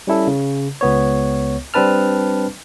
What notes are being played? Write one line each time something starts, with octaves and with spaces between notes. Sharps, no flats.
G3 C#4 E4 A4
C#3
C#2 B3 C#5
G3 C4 D4 B4 A5 F6